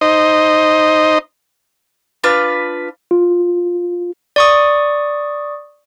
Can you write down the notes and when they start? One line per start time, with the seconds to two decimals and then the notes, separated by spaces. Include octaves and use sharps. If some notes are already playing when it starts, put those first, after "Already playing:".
0.01 D#4 C5 D#5
2.24 D4 F4 B4
3.11 F4
4.36 D5 C#6 D#6